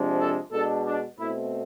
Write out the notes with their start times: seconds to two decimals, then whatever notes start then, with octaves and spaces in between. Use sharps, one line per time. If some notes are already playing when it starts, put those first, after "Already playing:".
Already playing: C3 F3 G#3 D4
0.19 A4
0.52 B2 G#3 D4 A4
0.85 D4
1.18 B2 A3 C4 E4